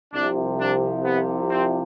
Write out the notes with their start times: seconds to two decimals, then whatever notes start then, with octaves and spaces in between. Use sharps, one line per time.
0.14 C2 C3 F3 D4
0.59 D4
1.05 B3
1.51 C4